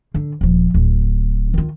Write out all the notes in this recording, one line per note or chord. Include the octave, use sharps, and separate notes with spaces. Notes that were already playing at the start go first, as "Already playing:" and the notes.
D3
D#1 F3
D1
D#3 F4